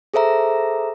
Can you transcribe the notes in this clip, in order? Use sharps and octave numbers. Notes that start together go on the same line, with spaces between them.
G#4 A4 C5 E5 A#5